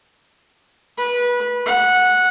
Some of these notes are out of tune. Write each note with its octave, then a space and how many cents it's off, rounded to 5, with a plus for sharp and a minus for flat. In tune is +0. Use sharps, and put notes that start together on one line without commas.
B4 -20
F#5 -10